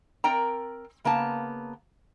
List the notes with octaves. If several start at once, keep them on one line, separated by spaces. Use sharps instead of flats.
C4 A#4 D5 G5 A#5
C#3 A#3 B3 A5